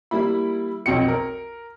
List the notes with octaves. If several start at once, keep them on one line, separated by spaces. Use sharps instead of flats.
G3 A#3 E4 B5
B1 F2 F#4 G5 C#7
A#4